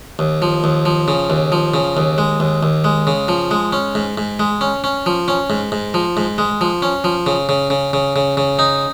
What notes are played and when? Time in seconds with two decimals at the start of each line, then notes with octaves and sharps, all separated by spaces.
0.19 D#2
0.42 F3
0.64 D#2
0.85 F3
1.08 C#3
1.30 D#2
1.52 F3
1.74 C#3
1.97 D#2
2.18 G#3
2.40 D#2
2.63 D#2
2.84 G#3
3.07 C#3
3.28 F3
3.51 G#3
3.73 C#4
3.95 G#2
4.18 G#2
4.39 G#3
4.61 C#4
4.84 C#4
5.06 F3
5.28 C#4
5.50 G#2
5.72 G#2
5.94 F3
6.17 G#2
6.38 G#3
6.61 F3
6.82 C#4
7.04 F3
7.26 C#3
7.49 C#3
7.70 C#3
7.93 C#3
8.16 C#3
8.37 C#3
8.59 D#4